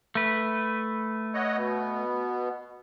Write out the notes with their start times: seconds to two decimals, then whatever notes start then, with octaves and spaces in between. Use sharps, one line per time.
0.15 A3 B4
1.34 C#5 D#5 F#5
1.57 B2 B3